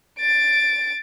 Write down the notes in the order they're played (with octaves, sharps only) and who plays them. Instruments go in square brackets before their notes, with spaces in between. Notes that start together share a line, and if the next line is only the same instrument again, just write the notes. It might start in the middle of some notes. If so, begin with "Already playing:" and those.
[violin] A6 D7